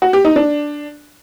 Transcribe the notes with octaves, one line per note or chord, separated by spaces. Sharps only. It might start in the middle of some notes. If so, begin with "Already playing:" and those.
F#4
G4
D#4
D4